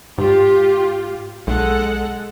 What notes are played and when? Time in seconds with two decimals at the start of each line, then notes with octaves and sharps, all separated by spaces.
0.18 G#2 F4 G4
1.47 B1 G#3 A4 F#5